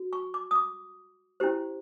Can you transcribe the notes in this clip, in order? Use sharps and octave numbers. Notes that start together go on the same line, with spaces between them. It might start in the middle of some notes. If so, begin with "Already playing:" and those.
Already playing: F#4
C#6
D6
D#6
D6
C#4 E4 G4 C5